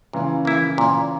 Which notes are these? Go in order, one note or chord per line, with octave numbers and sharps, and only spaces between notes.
A#2 C#3 E3
A#3 E4
A#2